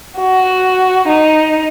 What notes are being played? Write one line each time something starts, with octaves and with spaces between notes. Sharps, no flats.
F#4
D#4